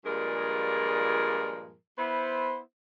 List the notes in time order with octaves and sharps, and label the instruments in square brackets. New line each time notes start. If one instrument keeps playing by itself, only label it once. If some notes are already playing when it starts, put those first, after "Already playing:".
[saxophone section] G2 A#2 F3 G#3 G#4 A#4
B3 E4 C5